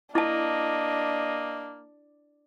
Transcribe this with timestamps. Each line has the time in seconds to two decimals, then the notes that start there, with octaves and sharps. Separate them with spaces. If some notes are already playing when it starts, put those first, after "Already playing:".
0.15 A#3 D4 E4 D#5 A5